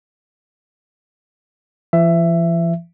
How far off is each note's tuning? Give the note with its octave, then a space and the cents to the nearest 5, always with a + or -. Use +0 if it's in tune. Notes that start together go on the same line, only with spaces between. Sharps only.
E3 +45 E5 +15